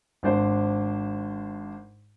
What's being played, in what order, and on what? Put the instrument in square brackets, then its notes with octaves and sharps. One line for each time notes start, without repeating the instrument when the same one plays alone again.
[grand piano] G#1 D4 C5